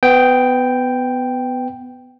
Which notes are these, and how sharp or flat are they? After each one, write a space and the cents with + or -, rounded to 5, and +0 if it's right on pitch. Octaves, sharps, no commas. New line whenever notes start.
B3 +20 G5 +0